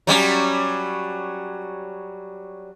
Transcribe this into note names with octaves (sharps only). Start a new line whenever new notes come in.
F#3 G3 C#4